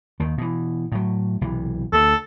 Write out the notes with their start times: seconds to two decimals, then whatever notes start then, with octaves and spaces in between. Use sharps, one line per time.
0.20 D#2 D#3
0.38 B2 E3
0.92 A2 F#3
1.41 B1 C3 E3
1.92 D2 A4